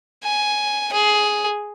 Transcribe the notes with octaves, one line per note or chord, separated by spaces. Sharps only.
G#5
G#4